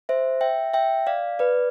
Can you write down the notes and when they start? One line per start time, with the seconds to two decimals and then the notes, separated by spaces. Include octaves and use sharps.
0.09 C5 E5
0.41 E5 G5
0.74 E5 G5
1.07 D5 F5
1.39 B4 D5